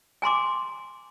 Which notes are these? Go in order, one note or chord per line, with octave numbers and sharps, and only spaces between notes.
G#5 A#5 C6 D6